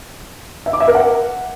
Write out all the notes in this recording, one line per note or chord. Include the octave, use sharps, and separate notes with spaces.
E5
D6
E5
A#4
F#5